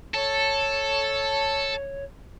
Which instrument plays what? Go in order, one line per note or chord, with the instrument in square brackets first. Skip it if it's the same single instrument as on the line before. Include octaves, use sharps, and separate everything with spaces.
[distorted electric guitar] A4 [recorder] C#5